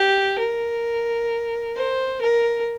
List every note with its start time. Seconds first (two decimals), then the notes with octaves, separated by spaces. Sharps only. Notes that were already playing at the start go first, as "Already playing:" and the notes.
Already playing: G4
0.38 A#4
1.76 C5
2.21 A#4